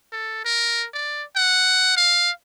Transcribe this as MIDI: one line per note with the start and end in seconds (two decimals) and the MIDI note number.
0.12 0.44 69
0.45 0.86 70
0.93 1.23 74
1.36 1.94 78
1.97 2.30 77